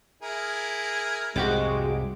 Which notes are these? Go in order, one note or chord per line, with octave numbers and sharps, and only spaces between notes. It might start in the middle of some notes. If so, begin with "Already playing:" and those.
E4 G#4 A#4
C2 F2 G#2 G#3 F#4 G4 D6